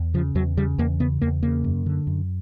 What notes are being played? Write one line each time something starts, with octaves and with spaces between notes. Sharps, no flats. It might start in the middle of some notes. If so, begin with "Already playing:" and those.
Already playing: E2
C#3 F3
E2 F#3
C#3 G3
E2 A#3
C#3 B3
E2 A#3
C#3 A#3
F#2
D3
F#2